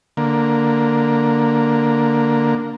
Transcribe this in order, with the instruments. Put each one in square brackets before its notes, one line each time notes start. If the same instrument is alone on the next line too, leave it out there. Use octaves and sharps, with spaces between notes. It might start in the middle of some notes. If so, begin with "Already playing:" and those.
[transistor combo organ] D3 A#3